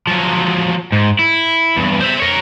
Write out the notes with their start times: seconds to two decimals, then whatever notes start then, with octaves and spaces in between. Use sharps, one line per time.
0.07 F3 F#3
0.92 G#2
1.19 E4
1.77 E2 G2
2.00 C5 E5
2.20 A#4 C#5